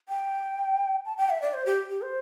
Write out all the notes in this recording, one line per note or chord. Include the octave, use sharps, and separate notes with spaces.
G5
A5
G5
E5
D5
C5
G4
G4
C5